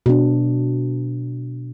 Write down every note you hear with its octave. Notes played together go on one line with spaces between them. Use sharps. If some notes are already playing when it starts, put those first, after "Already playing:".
B2 D4